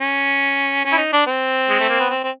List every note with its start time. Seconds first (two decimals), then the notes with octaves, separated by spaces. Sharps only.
0.01 C#4
0.85 C#4
0.92 E4
0.98 D#4
1.13 D4
1.27 C4
1.70 G#3
1.80 A3
1.89 A#3
2.00 B3
2.10 C4
2.24 C4